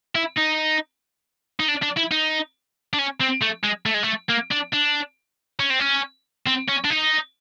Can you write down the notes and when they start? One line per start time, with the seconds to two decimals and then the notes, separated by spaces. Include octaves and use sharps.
0.15 E4
0.38 D#4
1.60 D#4
1.69 D4
1.83 D4
1.97 E4
2.12 D#4
2.94 D4
2.99 C#4
3.21 C4
3.42 A3
3.64 G#3
3.86 A3
3.94 G#3
4.03 A3
4.29 A#3
4.51 D4
4.73 D4
5.60 C#4
5.70 C4
5.80 C#4
6.47 C4
6.69 C#4
6.85 D4
6.90 D#4